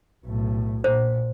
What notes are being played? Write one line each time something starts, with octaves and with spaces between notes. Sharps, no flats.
B1 A2
A#2 C5